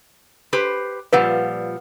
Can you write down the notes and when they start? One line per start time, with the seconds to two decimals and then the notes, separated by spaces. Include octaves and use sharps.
0.53 G4 B4 C5
1.13 A#2 F3 G3 B4 F5 F#5